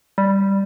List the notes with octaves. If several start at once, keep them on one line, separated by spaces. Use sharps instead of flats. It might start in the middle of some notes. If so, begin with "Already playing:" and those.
G3